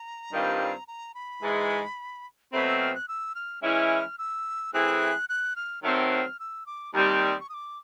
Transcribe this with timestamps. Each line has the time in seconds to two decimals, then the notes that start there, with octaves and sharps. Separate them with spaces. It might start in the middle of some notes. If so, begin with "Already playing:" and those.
Already playing: A#5
0.33 G2 D#3 G3 C4 F4
0.88 A#5
1.14 B5
1.42 G#2 E3 G#3
2.53 B2 F#3 A3 C4 B5
2.67 E6
2.80 F6
2.95 F#6
3.08 E6
3.35 F6
3.63 E3 G#3 C#4 E4 F6
4.18 E6
4.73 E3 A3 C4 E4 G#4 F#6
5.29 F#6
5.56 F6
5.83 D#3 F#3 A3 C4 F6
6.11 F#6
6.15 F6
6.40 E6
6.66 D6
6.94 D#2 D#3 G3 C4 D#6
7.40 C#6
7.49 D#6
7.54 D6